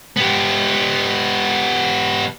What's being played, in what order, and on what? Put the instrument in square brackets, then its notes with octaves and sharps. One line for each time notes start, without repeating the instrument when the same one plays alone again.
[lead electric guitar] B3 G4